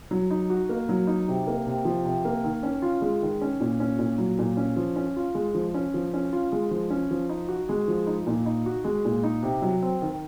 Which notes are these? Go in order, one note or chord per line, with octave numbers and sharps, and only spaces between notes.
F#3
D#4
F#4
A#3
F#3
D#4
C3
A#3
C3
F3
C3
A#3
D#3
C#4
F4
G#3
D#3
C#4
A#2
C#4
A#2
F#3
A#2
C#4
F3
C#4
F4
G#3
F3
C#4
F3
C#4
F4
G#3
F3
C#4
F3
D#4
F#4
G#3
F3
D#4
A#2
D#4
F#4
G#3
A#2
D#4
C3
F#3
C4
D#3